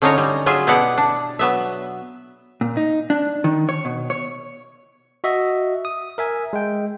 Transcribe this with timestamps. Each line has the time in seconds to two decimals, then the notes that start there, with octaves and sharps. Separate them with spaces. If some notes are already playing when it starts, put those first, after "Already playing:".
0.02 D3 C#4 D#4 F4 C#5 A#5
0.18 G3
0.46 F#3 F4 G#4 E5
0.67 B2 B3 E4 G4 D5 F#5
0.98 D4
1.39 F#3 B3 E5
2.61 A#2
2.77 D#4
3.10 D4
3.44 D#3
3.69 C#5
3.85 B2
4.10 C#5
5.24 F#4 D#5 E5
5.85 D#6
6.18 A#4 E5 G#5
6.53 G#3 G5